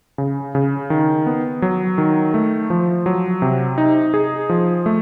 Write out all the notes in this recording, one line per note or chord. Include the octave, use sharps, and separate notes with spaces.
C#3
C#3
D#3
B3
F#3
D#3
A3
F3
F#3
C3
D#4
G#4
F3
A3